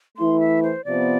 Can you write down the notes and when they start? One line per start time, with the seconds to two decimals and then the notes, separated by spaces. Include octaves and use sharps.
0.17 E3 A3 E4 C6
0.40 E5
0.63 C5
0.85 C3 F3 B3 D5